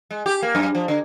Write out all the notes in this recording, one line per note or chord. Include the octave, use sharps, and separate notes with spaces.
G#3
G4
A#3
F#2
F3
D3